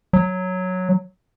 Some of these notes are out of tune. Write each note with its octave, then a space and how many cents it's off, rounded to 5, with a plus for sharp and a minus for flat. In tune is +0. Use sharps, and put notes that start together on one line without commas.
F#3 -5